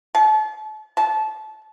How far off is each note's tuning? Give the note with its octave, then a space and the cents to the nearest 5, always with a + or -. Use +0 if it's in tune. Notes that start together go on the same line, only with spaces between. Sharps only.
A5 -35
A5 -25